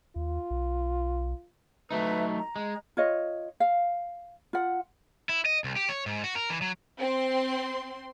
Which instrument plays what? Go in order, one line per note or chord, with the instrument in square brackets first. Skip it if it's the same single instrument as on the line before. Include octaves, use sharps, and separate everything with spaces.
[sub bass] D#2 [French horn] F4
[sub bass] B1
[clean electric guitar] F#3 A3 D#4 [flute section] B4 E5
[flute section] A#5
[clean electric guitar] G#3
[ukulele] F4 C#5 D#5
F5
F4 F#5
[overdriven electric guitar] E4
D#5
C2
G4
C#5
G#2
F#4
A#4
E3
F#3
[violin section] C4 C6